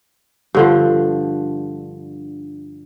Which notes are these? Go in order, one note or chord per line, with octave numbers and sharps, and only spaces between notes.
G2 D3 F3